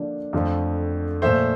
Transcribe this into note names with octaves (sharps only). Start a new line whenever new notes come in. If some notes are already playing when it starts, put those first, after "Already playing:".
Already playing: D3 F3 A#3 D4
F2 D3 F3 A3
A#2 F3 A3 C5 E5